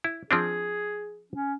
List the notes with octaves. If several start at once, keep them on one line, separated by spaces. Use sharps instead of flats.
E4
F3 C4 D4 G#4
C#4